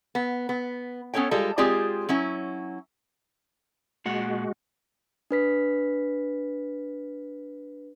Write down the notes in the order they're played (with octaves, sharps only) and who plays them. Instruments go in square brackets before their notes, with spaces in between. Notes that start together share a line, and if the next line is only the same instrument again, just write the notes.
[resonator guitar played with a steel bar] B3
B3
B3 C#4 A4 C#5 G5
G3 G#3 F4 A4
G#3 C4 F4 G4 G#4 D5
F#3 C#4 E4
[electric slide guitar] A#2 F#5 [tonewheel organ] G#3 F#4
[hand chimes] D4 B4 B6